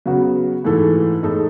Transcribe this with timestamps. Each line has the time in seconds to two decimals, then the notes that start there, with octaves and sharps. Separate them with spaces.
0.06 C#3 F#3 B3 F#4
0.64 G#2 E3 A3 E4 A4
1.23 A2 G#3 D#4 A4